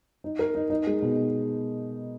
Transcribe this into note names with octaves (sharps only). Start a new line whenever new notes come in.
D#4
A#4
D#4
D#4
G#3
B2